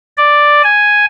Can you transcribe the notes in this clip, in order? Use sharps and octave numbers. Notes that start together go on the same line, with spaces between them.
D5
G#5